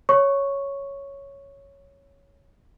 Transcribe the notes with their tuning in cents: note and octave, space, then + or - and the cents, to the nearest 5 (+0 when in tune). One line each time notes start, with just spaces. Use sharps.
C#5 +0 C#6 +0